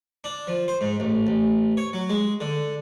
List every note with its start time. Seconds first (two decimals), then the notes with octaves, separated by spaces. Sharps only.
0.24 D4
0.47 F3
0.68 C5
0.81 G#2
1.00 A1
1.27 A1
1.77 C#5
1.93 F#3
2.10 G#3
2.40 D3